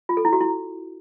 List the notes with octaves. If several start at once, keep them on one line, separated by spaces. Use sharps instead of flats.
F4
A4
E4
F#4
E4